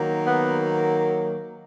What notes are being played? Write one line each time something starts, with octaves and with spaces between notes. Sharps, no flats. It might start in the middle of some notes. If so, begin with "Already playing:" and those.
Already playing: D#3 F#3 A#3
B3